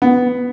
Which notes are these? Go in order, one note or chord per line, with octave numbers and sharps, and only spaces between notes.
B3